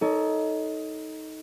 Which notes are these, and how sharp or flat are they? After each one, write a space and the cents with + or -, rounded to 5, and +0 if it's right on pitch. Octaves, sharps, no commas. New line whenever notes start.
D#4 +15 A4 +0 C#5 +35